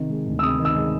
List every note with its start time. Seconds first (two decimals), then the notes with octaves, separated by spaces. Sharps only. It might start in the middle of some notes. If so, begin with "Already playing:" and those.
Already playing: C3 D#3
0.10 G#3
0.27 D2
0.39 E6
0.42 C3 D#6
0.59 D#3
0.65 E6
0.76 G#3